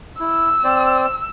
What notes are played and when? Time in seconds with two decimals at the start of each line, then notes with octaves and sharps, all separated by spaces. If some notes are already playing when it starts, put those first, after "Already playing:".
0.20 E4 E6
0.64 C4 C5 D5